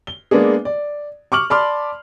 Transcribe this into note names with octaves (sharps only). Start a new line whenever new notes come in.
G7
G#3 A#3 B3 D4 G#4
D5
C#6 D6 F6 F#7
D5 A5 B5 C6 D6 F6